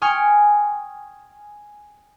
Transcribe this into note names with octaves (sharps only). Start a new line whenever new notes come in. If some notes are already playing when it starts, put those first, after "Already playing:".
G5 G#5 C#6 D#6 F6 G#6